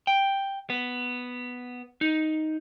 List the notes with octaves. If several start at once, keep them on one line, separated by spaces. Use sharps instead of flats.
G5
B3
D#4